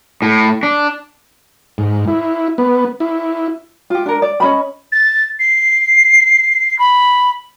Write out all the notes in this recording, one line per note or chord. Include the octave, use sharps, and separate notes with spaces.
A2
D4
G#2
E4
B3
E4
F4 G4
D4 A#4
D5
C#4 D#5 B5
A6
C7
B5